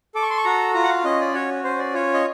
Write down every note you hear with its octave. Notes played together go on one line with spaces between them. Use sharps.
A4 D6
C#6
C6
C#6
F#4 A#5
F4 A#5
F#5
F5
C#4 D#5
D5
F#4 C#5
C#4 C5
D5
F4 C#5
D#5